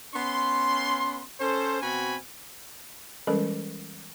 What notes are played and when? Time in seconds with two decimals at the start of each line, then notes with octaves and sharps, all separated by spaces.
0.15 B3 C#4 C6
1.40 C#4 A4 C5
1.82 B2 C4 F#4 G#5 B5
3.27 E3 G3 G#3 C#4 A4 A#4